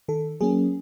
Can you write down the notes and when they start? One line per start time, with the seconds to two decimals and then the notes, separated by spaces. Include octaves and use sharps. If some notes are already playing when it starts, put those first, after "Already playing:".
0.08 D#3 A4
0.41 F#3 A#3 C#4 G#4